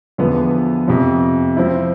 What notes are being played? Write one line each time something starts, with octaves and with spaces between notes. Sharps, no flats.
E2 D3 F3 B3
F2 C3 F3
F3 C4 E4